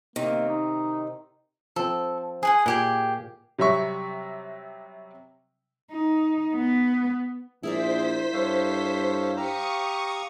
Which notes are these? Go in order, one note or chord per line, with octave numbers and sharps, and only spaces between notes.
C3 D#3 A#3
D#4
F3 C4 A4
G#4 F#5 G#5
A#2 E4 G4 G#4
C3 F#3 G3 E5 C#6
D#4
B3
A#1 E4 G#4 A#4 C5 D5 E5 B6
G2 A4 C#5 F5
G4 F5 A#5 C#6 D#6 C#7